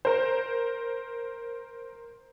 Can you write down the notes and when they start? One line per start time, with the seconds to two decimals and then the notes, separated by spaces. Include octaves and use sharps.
0.05 A#4 C5